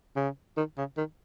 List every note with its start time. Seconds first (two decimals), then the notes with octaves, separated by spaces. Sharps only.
0.16 C#3
0.57 D#3
0.78 C#3
0.97 D#3